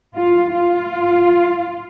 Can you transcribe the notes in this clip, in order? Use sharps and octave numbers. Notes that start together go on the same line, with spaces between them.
F4
F4